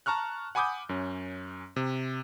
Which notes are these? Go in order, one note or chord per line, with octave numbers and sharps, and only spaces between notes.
A5 A#5 C#6 F6 F#6
F#5 G#5 B5 D6 D#6 G6
F#2 C#4
C3